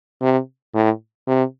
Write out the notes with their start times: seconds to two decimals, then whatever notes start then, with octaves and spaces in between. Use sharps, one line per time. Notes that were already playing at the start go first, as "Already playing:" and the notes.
0.21 C3
0.74 A2
1.27 C3